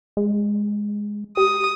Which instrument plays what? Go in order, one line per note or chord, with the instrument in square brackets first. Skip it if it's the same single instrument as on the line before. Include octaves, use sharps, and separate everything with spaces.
[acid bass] G#3
[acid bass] G4 [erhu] D#6